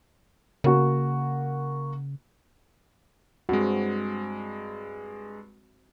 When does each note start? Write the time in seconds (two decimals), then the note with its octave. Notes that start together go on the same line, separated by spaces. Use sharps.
0.64 C#3 A#3 F#4
3.49 G2 G#3 C4 F#4